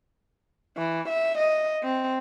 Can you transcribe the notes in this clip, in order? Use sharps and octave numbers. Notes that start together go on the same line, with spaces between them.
E3
E5
D#5
C4